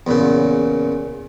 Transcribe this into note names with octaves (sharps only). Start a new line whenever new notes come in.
E2 A#2 C#3